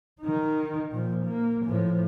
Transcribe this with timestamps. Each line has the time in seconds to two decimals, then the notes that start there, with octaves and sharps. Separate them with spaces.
0.21 D#3 D#4
0.92 A#2 F3
1.25 A#3
1.66 A2 F3